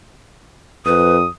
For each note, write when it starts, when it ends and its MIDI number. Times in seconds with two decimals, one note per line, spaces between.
0.86 1.25 41
0.86 1.16 71
0.86 1.28 87